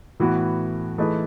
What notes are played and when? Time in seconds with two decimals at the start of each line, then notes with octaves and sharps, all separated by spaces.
0.20 A2 E3 B3 F#4
0.98 E3 A3 D#4 G#4 B4